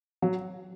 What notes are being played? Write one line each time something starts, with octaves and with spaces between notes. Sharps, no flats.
F#3